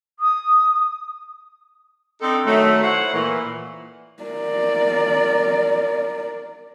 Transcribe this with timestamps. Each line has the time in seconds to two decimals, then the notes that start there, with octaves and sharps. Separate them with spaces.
0.19 D#6
2.21 C4 D4 D#4 A4
2.46 D#3 F#3 A3
2.83 E4 C5 C#5 E5 F#5
3.13 A#2 E3
4.23 A#4 D5